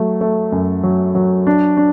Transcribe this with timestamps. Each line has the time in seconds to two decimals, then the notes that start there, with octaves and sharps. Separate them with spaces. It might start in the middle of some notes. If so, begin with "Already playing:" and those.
Already playing: F#3 A3
0.21 A3
0.52 F#2
0.83 F#3
1.15 F#3
1.47 D4
1.77 D4